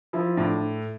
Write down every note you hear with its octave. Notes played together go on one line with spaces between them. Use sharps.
F3 E4
A2 D4